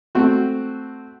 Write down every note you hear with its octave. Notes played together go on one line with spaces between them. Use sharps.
A3 C4 F#4